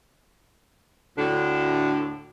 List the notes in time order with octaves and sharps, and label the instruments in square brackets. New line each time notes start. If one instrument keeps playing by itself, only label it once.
[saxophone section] D2 A2 D3 D4